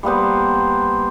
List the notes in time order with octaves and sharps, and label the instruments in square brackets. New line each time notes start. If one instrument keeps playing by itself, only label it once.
[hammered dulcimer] G3 A#3 B3 C5